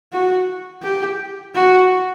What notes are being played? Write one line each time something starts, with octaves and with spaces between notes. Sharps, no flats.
F#4
G4
F#4